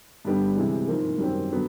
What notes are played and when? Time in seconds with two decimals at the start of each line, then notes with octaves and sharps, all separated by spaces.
0.25 G2 D3 G3 B3 D4
0.56 C3 E3 G#3
0.88 G#2 F3 A#3
1.19 F#2 D#3 G3 C4
1.52 D3 F#3 B3